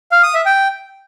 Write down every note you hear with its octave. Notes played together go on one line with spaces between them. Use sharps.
F5
D#6
E5
G5